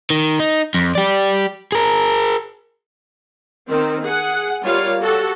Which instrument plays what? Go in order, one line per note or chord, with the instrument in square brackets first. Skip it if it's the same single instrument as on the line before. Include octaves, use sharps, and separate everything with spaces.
[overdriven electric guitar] D#3
D#4
F2
G4 D5
G#4 A#4
[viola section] D#3 C4
G#4 F#5
G3 F4 A#4 C#5 F5
F#4 G4 A4